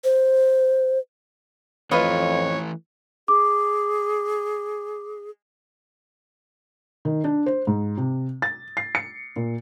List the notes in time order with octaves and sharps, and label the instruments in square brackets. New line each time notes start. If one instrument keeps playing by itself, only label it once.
[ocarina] C5
[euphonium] F2 [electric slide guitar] E3 A3 [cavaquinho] F4 B4 D#5 [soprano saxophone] C#5
[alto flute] G#4 [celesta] D6
[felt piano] D#3
D4
C5
G#2
C3
A6
C7
C#7
A#2